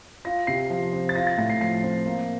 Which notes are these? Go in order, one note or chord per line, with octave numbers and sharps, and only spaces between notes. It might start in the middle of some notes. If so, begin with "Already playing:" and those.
F4 A#6
C3 C7
F3
C4
A6
F4 A#6
A6
A2 A#6
C7
F3 C7
C4
A#3